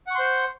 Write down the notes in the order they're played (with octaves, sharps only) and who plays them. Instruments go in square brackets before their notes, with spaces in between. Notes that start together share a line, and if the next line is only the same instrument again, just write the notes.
[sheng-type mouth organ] F#5
C#6
C6
C5